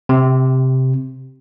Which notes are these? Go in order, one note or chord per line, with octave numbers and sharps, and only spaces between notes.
C3